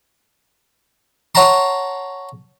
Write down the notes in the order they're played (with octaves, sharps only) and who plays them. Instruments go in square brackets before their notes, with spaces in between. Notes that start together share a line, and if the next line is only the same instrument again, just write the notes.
[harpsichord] C#5 F#5 A5 A#5 C6